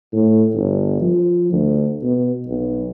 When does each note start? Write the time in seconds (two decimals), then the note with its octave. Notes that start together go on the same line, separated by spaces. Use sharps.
0.13 A2
0.54 G1
1.01 F3
1.52 D2
2.03 B2
2.47 B1